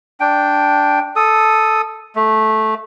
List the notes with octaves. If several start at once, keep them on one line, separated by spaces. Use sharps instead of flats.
D4 G5
A4 D#6
A3